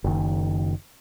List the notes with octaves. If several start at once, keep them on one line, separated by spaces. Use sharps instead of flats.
F#1 D#3